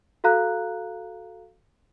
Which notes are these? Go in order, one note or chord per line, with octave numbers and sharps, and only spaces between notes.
F#4 A4 F5 A#5 F#6